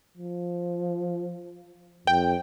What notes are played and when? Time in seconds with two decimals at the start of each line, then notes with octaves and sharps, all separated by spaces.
0.17 F3
2.07 F2 G5